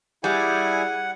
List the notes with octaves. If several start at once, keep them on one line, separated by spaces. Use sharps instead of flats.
G3 E4 G#4 F#5 G#5